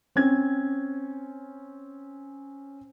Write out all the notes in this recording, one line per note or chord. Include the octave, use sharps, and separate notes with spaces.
C4 C#4 G#6